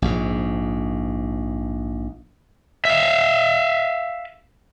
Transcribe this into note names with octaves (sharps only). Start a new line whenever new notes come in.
A#1 G#2
E5 F5